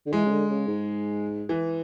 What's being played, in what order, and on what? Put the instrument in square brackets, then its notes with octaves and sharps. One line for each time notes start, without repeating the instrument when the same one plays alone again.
[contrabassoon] D3
[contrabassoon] E3 [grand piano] G#3
[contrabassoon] C#3
D3
C#3
G#2
[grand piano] E3